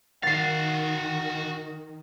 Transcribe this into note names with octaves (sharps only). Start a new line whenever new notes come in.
D#3 F#4 F5 F#5 A6 C7